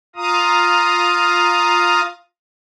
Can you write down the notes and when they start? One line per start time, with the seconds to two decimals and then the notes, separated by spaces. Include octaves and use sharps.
0.16 F4 F5 A#5 D#6